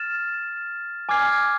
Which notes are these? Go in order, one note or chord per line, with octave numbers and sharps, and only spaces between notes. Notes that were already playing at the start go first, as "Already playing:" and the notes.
Already playing: F6 A6 E7
G#5 D6 F6 G#6 C7